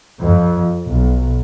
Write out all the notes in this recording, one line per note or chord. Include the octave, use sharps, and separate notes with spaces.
F2
B1